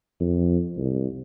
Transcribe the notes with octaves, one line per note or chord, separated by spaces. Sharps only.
F2
C2